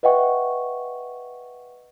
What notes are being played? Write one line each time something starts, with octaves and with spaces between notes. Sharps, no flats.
B4 D#5 E5 F#5 G5 C#6